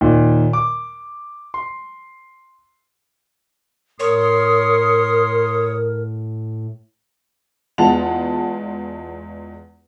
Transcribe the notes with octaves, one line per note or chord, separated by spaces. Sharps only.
D#2 A#2 D#3
D6
C6
A2 A#4 C#5 C6 D#6
E2 G#3 F4 F#5 A5 F7